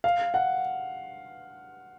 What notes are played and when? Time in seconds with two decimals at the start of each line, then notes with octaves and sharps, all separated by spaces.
0.04 F5
0.34 F#5